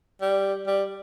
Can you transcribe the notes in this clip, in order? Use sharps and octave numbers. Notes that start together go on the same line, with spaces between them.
G3
G3